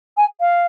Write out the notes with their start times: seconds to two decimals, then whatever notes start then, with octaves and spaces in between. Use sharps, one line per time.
0.17 G#5
0.40 F5